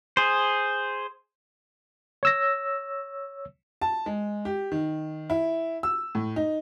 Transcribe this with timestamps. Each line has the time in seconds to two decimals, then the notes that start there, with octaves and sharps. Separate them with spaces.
0.17 G#4 C5
2.23 C#5 E6 A#6
3.82 A5
4.06 G#3
4.45 G4
4.72 D#3
5.30 E4
5.83 E6
6.15 A2
6.36 D#4